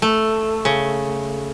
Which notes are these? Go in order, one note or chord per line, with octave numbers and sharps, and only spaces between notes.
A3
C#3